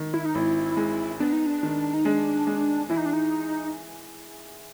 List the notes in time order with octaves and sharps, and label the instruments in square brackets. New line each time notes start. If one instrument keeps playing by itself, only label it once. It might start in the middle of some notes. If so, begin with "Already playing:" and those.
Already playing: [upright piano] D#3
[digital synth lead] E4
D#4
[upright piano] G#1 [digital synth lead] E4
[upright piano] G#3
[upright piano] B3 [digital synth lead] D4
[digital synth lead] D#4
D4
[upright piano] D#3
[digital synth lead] D#4
[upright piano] G#3 [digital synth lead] D4
[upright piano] G#3
[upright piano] E3 [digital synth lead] E4
[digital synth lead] D#4
D4
D#4